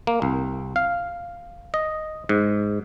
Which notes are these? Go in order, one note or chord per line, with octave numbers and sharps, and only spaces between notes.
A#3
C2
F5
D#5
G#2